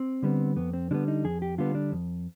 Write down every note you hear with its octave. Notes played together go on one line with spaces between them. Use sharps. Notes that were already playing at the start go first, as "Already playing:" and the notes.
Already playing: C4
D3 G3 B3
F2 B3
C4
D3 G3 B3 D4
D#4
F2 G#4
G4
D3 G3 B3 F4
D4
F2